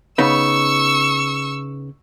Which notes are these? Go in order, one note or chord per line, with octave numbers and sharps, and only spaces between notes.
C#3 B3 D#4 C#6 E6